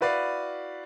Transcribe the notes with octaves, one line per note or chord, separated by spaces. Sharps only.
E4 F#4 B4 D5 F5